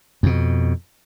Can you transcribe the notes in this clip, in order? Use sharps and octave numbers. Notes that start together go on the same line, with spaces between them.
F2 B2